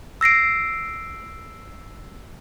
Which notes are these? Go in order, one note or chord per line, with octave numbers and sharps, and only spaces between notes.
E6 A#6 C7 D7